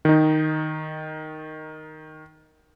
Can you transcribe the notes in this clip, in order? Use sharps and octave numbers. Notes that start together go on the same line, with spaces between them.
D#3 D#4